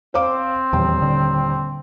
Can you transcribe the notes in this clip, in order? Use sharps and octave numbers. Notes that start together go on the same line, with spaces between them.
C4 C5 F5 D6
D#1 E2 G5
D3